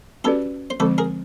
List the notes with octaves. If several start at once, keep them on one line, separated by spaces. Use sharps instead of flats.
C#4 F#4 G4 A4 B4 D5
C5
D3 F3 G#3 C4 A4 B4
G#4 A#4